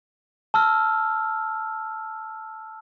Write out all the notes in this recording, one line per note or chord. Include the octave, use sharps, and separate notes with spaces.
A5 E6 F6